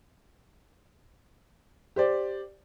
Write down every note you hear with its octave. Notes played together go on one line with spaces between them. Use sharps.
G4 C5 D5